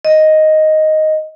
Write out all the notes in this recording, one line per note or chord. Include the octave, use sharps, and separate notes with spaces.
D#5